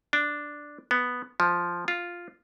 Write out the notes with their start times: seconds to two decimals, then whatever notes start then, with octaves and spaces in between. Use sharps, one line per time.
0.13 D4
0.91 B3
1.40 F3
1.88 F4